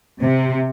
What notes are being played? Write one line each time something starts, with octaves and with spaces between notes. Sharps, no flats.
C3